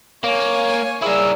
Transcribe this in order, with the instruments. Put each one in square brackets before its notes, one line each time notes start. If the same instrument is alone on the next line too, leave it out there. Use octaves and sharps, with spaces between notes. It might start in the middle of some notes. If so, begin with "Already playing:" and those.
[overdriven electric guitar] A#3 [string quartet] C#5 G#5
[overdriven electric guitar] E4 A#4 [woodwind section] G#4 D5 E6